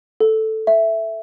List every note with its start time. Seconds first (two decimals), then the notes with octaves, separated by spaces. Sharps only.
0.20 A4
0.67 E5